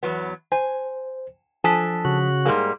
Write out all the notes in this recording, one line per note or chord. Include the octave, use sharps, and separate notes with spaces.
E2 F#3 B3
C5 G#5
F3 D4 A4 G#5 D#6 B6
C#3 F#4
G#2 G3 A#3 G#4